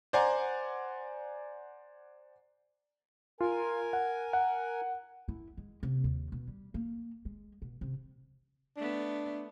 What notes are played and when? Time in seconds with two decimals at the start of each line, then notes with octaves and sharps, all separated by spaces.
0.13 C5 D5 F#5 G#5 A#5
3.41 F4 A#4 G#5
3.93 F#5
4.33 F#5
5.28 E4
5.57 G#3
5.83 C3
6.04 D#2
6.32 B2
6.48 G3
6.74 A#3
7.25 G#3
7.62 B2
7.81 C3
8.77 A3 B3 D4